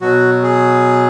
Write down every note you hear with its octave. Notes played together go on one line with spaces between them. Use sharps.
B2 F#3 F#4
G#4